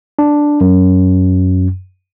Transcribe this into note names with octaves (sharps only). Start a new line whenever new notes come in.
D4
F#2